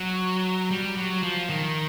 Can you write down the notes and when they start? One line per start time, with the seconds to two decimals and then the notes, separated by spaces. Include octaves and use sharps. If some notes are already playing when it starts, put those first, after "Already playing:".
Already playing: F#3
0.71 G3
0.97 F#3
1.23 F3
1.49 D#3